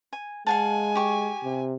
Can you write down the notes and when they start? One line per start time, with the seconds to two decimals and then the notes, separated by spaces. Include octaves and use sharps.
0.13 G#5
0.47 G#3 F5 F#5 G#5 A5
0.95 G4 C#6
1.44 C3